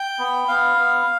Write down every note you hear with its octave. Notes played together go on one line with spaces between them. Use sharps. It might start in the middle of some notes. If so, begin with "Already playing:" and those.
Already playing: G5
B3
B3 F5
B3